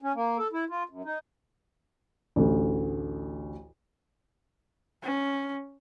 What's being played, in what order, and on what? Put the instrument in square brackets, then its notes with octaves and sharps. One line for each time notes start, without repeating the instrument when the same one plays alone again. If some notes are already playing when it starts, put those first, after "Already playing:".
[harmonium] C#4
A#3
A4
E4
F4
F#2
D#4
[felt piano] A1 D2
[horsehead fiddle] C#4